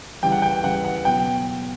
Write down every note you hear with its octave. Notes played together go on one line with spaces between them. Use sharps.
C#3 E3 G3 G5
F#5
G5
C#3 E3 G3 F#5
F#5
B2 F#3 G5